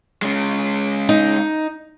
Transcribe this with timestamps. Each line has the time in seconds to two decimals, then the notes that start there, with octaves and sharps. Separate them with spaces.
0.22 G#3 C#4
1.09 D#4